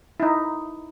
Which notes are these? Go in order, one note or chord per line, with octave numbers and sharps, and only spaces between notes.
D#4 E4